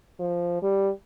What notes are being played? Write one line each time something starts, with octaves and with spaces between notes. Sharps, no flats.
F3
G3